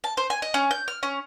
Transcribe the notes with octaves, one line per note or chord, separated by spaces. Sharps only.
A5
C5
G#5
D#5
C#4
G6
F6
C#4